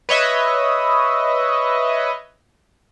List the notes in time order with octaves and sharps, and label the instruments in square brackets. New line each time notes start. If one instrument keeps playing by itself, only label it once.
[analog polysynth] B4 C#5 D#5 E5